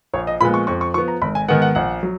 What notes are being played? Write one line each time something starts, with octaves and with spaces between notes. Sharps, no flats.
A#1 C#5
D#5
A#2 F3 G#3 B3 B5
C#6
F2 C#6
C#6
F3 B3 C#6
A#5
G#1 B5
G#5
G#2 D#3 G#3 B3 F#5
F#5
A#1 F#5
F#3